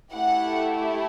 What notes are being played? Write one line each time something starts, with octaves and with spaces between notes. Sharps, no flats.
A3 E4 G4 F#5